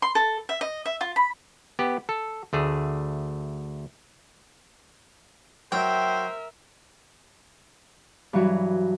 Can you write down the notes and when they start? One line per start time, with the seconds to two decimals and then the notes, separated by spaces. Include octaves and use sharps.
0.02 C6
0.15 A4
0.49 E5
0.61 D#5
0.86 E5
1.01 F4
1.16 B5
1.79 B3 G4
2.09 A4
2.53 D2 A3 G#4
5.72 F#3 A#4 C5 E5 G5
8.33 G2 E3 F#3 F#4